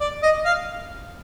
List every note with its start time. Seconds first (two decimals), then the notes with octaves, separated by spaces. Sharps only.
0.01 D5
0.23 D#5
0.45 F5